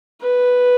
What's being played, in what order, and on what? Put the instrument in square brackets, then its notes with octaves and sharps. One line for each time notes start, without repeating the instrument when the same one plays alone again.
[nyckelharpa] B4